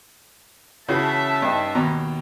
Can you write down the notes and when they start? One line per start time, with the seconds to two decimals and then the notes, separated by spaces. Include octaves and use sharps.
0.88 C#3 E3 C#4 F#4 E5 A5
1.42 G2 D#4
1.75 D#2 B2 A#5